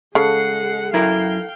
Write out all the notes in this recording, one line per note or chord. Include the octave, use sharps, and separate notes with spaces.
C#3 G#3 A4 F#5 C7
F#2 E4 A#4 F5 G5